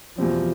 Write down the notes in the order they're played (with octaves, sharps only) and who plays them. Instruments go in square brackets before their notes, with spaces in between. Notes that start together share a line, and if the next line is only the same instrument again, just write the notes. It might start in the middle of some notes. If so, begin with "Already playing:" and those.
[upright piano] E2 B2 G3 C4 [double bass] F3